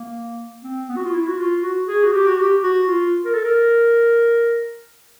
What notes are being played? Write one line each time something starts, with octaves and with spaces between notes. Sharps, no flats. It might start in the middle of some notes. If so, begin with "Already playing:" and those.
Already playing: A#3
C4
B3
F#4
F4
E4
F#4
F4
F#4
G#4
F#4
G4
F#4
G4
F#4
F4
A#4
A4
A#4